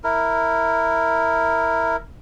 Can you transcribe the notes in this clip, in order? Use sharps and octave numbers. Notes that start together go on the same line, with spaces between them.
E4 A#4